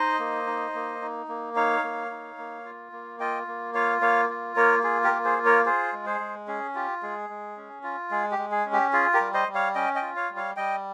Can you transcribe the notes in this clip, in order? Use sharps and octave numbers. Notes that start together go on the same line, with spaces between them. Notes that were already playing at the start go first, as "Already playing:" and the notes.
Already playing: D#4 C5 D#5
A#3
D#4
A#3
D#4
A#3
D#4 C#5 F5
A#3
D#4
A#3
F4
A#3
F4 D#5 G5
A#3
F4 C#5 F5
A#3 C#5 F5
F4
A#3 A#4 C#5
F4 G#4
G4 A#4
A#3
G#4 C5
F4
A#4 C#5
F4 G#4 C5
G#3
G#4 C5
G#3
C#4 G#4
F4 G4
G#3 G#4
G#3
C#4
F4
G#3 G#4
G4
G#3
G#4
C#4
G4
F4 G#4
G4 A#4
G3
C5 D#5
G3
C#5 F5
C#4 D#5 G5
D#5 G5
F4
C#5 F5
G3
C#5 F5
G3 D#5 G5